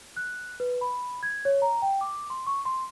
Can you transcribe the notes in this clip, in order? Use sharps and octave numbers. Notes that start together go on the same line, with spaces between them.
F#6
B4
B5
G#6
C#5
A#5
G5
D6
C6
C#6
C6